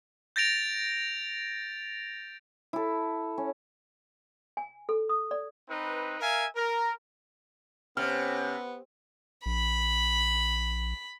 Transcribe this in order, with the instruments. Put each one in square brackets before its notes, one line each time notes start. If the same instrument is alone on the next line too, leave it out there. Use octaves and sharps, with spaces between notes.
[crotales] G6 A6 A#6 D7 F7
[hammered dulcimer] E4 A4
C#4
[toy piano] G#5
A4
D#6
D5
[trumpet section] C4 D#4 B4
A#4 E5 F5 G#5
A#4
[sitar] C3 [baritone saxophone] B3 [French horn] C#4 [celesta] F6
[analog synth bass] A#1 [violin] B5